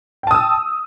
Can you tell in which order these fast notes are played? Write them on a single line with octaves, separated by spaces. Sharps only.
G5 A5 D#6 E6